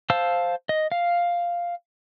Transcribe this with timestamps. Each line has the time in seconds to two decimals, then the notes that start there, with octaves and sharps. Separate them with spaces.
0.10 C5 F5 A5 E6
0.69 D#5
0.92 F5